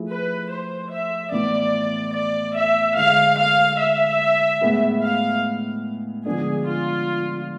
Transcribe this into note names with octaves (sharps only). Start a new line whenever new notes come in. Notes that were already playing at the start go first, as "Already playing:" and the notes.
Already playing: F3 A3 E4 G#4
B4
C5
E5
A2 E3 B3 E4 D5
D5
E5
D3 G#3 D4 G#4 F5
F5
E5
A2 G#3 B3 E4 G#4
F5
D3 F3 G#3 B3 D4 G#4
F4